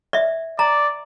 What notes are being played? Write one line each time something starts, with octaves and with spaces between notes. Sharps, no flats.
D5 E5
D5 A#5